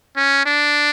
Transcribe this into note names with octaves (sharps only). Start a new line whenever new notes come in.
C#4
D4